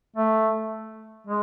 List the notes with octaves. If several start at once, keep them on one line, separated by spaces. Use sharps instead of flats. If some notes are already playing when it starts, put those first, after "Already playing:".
A3
G#3